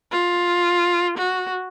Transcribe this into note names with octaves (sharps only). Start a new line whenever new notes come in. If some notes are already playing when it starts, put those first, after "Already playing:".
F4
F#4